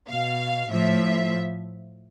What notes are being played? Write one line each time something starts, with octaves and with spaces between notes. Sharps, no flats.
B2 F5
A2 F3 E5